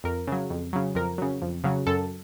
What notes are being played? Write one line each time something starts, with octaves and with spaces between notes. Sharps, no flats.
F2 A#4
C#3 F#3
F2
C#3 F#3
F2 A#4
C#3 F#3
F2
C#3 F#3
F#2 A4